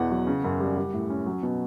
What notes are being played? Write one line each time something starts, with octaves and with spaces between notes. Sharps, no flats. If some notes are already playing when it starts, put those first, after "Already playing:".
Already playing: E2 B2 F#5
F#3
C#3
F#2
G3
G3
A2
C#4
F#3
B2